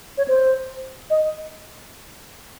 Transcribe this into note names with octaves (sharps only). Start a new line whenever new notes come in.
C#5
C5
D#5